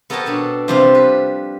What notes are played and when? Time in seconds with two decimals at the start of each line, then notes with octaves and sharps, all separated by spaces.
0.10 B3 A4 A#4 C#5 G5 A5
0.26 B2 D4
0.68 C3 F3 G3 D4 C5 F5
0.95 B4